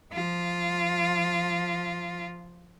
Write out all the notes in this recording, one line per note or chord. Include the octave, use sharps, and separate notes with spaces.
F3 F4